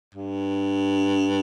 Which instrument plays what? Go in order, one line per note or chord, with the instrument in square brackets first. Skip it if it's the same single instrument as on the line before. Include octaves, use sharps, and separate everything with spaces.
[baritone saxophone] G2